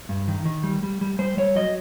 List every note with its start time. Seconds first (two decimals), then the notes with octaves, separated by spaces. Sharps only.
0.09 G2
0.28 D#3
0.45 D#3
0.63 G3
0.83 G3
1.01 G3
1.19 G3 C5
1.37 G3 C#5
1.55 F#3 D#5